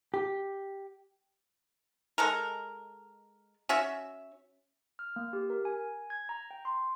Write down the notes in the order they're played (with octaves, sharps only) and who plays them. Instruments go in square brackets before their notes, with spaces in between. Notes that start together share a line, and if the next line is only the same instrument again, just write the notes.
[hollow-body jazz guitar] G4
[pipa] G#3 A4 A#4
C#4 F#4 E5
[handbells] F6
A#3
G4
A#4
G#5
G#6
A#5
G5
C6